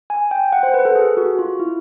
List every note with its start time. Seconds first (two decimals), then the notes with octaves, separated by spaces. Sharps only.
0.10 G#5
0.31 G5
0.52 F#5
0.63 C5
0.74 B4
0.85 A4
0.95 G#4
1.17 F#4
1.39 F4
1.60 E4